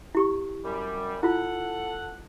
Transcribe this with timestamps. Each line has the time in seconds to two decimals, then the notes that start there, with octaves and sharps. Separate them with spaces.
0.15 E4 G4 C#6
0.64 F#2 G3
1.23 E4 F4 A4 F#5